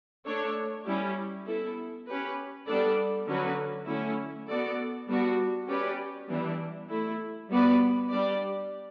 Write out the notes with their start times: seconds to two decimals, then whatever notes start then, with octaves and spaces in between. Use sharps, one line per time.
0.25 A3 D4 A4 C#5
0.86 G3 C#4 E4 G4
1.46 B3 E4 A4
2.07 C#4 G4 B4
2.66 G3 B3 D4 A4 D5
3.27 D3 F#3 C#4 F#4 B4
3.87 D3 A3 C#4 E4
4.48 B3 F#4 A4 D5
5.07 G3 B3 D4 F#4
5.68 C#4 G4 B4 D5
6.28 E3 G3 B3 D4
6.89 A3 E4 A4
7.49 G3 B3 F#4 B4 D5
8.10 G3 D4 G4 D5